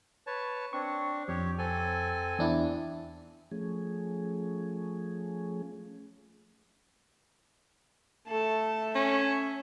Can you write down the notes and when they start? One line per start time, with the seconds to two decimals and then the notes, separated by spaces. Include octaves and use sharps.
0.27 B4 C#5 A5
0.73 C4 D4 C#6
1.28 F2 G4 C#5
1.58 C4 A4 G#5
2.39 E2 D4 E4
3.52 F3 A3 C#4 G#4
8.28 A3 A4 A5
8.95 C#4 E5